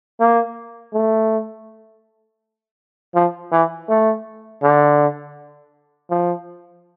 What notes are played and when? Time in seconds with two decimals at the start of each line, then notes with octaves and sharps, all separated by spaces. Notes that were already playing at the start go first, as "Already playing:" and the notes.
0.20 A#3
0.94 A3
3.15 F3
3.52 E3
3.89 A3
4.63 D3
6.10 F3